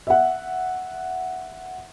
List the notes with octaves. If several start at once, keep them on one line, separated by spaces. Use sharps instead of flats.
E5 F#5